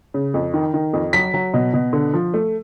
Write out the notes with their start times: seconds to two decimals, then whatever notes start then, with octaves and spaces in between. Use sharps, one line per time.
0.14 C#3
0.34 F2
0.54 D#3
0.74 D#3
0.93 F2
1.13 F#3 B6
1.34 F#3
1.54 B2
1.73 B2
1.93 D3
2.14 F3
2.34 A3